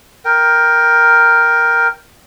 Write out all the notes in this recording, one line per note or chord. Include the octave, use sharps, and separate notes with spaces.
A#4 G5